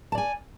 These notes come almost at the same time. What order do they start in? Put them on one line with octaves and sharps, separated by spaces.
A5 D5 G#5